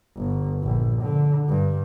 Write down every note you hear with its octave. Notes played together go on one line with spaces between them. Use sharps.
G1
A#1
D3
G2